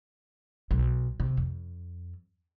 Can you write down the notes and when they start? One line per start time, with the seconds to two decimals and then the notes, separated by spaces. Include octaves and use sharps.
0.71 B1
1.20 C3
1.37 F2